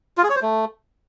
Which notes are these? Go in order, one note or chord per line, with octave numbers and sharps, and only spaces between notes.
F4
G#4
C#5
C5
A3